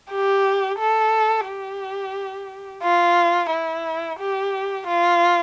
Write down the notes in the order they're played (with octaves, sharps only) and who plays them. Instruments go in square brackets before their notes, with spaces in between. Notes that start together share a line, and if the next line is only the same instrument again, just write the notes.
[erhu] G4
A4
G4
F4
E4
G4
F4